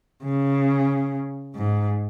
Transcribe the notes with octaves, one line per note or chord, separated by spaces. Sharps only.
C#3
G#2